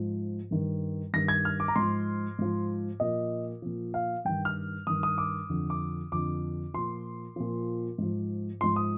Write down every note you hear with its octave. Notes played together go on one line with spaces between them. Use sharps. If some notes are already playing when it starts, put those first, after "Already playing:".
Already playing: G#2 F3
G2 D#3
G2 D#3 A#6
G#6
F6
D6
A#5
G#2 F3 C6
G#2 F3
A#2 F3 D#5
A#2 F3
F5
G2 D#3 G5
F6
G2 D#3 D#6
D#6
D6
F2 D3 F3
D6
F2 D3 F3 D6
A#2 F3 C6
A#2 F3
G#2 F3
G#2 F3 C6
D#6